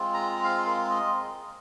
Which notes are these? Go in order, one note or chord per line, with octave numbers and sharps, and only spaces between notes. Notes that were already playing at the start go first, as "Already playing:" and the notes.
Already playing: G#3 C4 F4
A#5
F5
A#4
D#5